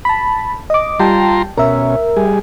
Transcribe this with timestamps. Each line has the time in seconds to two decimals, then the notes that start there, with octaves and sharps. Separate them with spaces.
0.05 A5 B5
0.70 D#5 D6
1.00 G3 F4 G5 A5 A#5 C6
1.57 B2 C#4 A#4 E5
2.16 G3 G#4